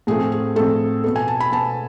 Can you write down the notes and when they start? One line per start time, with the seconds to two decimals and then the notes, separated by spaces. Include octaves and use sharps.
0.07 A2 F3 A3 C4 G#4
0.32 G#4
0.56 A2 F3 A3 C4 A4
1.04 B2 B3 A4
1.16 G#5
1.28 A5
1.40 B5
1.52 B2 B3 A5